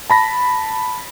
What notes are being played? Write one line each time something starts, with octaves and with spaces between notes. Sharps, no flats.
A5 B5 A#6